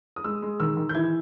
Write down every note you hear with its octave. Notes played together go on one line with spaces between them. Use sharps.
D#6
G#3 E6
G#3
D#3 E6
D#3
G6
E3 G#6